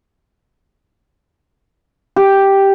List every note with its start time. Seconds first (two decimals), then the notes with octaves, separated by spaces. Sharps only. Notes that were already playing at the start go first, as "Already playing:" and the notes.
2.16 G4